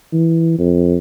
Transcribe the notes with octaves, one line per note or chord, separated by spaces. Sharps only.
E3
F2